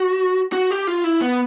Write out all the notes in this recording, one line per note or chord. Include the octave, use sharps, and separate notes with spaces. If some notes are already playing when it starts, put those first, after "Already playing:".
Already playing: F#4
F#4
G4
F4
E4
B3